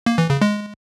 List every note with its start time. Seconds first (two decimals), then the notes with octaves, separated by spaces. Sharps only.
0.06 A#3
0.18 E3
0.30 C#3
0.41 G#3